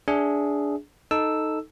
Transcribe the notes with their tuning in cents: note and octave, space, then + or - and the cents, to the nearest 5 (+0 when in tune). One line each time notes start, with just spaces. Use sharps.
D4 -15 G#4 +0 E5 +0
D#4 +0 A4 +0 E6 +0